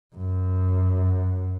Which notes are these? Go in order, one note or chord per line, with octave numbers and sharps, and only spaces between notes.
F#2